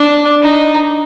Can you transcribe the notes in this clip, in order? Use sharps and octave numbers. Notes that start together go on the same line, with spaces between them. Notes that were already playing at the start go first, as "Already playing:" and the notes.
Already playing: D4
D#4